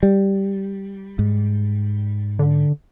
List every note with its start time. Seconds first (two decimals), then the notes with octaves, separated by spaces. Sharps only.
0.03 G3
1.19 G#2
2.39 D3